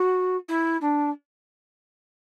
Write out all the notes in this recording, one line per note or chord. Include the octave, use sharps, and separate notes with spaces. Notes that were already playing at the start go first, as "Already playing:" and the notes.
Already playing: F#4
E4
D4